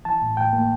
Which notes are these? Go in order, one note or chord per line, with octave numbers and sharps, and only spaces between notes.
E3 A5
A2
A2 G5
A#3